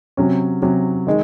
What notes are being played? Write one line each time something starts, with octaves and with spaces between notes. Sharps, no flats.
C3 F#3 C#4
C3 F#3 C#4
D#3 G#3